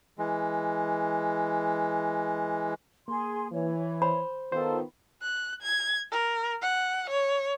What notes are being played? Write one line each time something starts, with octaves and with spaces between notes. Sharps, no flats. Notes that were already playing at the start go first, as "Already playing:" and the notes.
E3 G#3
A#3 G#4 C6
E3 C#5
C5 B5
D#3 B3 F4 A4 C5
F#6
G#6
A#4
F#5
C#5